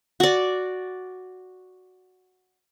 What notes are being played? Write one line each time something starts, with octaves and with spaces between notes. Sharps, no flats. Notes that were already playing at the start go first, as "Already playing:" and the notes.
F#4 D5